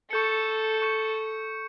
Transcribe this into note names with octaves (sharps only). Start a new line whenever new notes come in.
A4 C#6 G6 C#7
C#6 G6 C#7